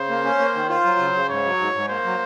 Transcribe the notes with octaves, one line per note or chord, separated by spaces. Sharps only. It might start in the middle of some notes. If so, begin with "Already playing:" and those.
Already playing: C#3 C5
A#3
C#4
A#3
D#3
F4 C5
F#3
C#3
C#3
G#2 C#5
F#3
G#2
G#2
A#3 C5
F#3